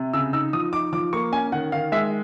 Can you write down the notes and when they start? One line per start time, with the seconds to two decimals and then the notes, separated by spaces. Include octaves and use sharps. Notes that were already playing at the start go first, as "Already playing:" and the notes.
Already playing: C3
0.13 C#3 E6
0.33 D#4 E6
0.53 F3 D#6
0.73 D#4 D6
0.93 F3 D6
1.13 A#3 C#6
1.32 C#4 G#5
1.52 D#3 F#5
1.72 D#3 F5
1.92 G#3 E5